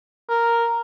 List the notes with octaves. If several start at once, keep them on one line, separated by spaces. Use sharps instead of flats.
A#4